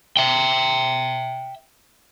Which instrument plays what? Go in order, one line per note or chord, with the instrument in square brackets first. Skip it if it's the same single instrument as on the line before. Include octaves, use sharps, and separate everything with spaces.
[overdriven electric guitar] E5 G5